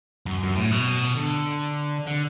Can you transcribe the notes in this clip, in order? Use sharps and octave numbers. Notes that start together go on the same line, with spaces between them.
F#2
F#2
A2
B2
D3
D3